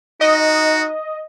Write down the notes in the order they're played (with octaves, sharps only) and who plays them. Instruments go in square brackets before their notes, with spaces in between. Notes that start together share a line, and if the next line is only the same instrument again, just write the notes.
[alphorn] D#4 [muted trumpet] F#4 [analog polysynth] D#5